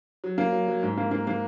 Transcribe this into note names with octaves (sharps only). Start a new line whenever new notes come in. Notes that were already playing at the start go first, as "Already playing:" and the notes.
F#3
A#3
F#3
F#3
G#2
A#3
A#3
A#3